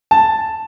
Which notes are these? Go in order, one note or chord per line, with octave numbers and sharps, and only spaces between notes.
A5